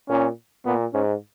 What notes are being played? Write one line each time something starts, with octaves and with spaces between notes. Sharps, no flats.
A#2 C#4
A#2 B3
G#2 C#4